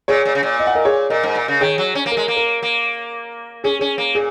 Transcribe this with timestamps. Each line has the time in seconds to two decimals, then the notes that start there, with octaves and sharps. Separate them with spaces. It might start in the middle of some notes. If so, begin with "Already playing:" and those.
0.08 A#2 G#4 C#5
0.25 A#2
0.35 C#3
0.43 A#2
0.60 D#5
0.67 F#5
0.75 A#4 D#5
0.85 G#4 C#5
1.10 A#2 A#4 D#5
1.23 G#2
1.35 A#2
1.48 C#3
1.61 D#3 G#4 C#5
1.78 F#3
1.95 C#4
2.06 A#3
2.12 A#4
2.17 G#3
2.28 A#3
2.37 A#4
2.63 A#3
3.64 C#4 G#4
3.79 C#4 G#4
3.98 A#3
4.15 A#2 G#4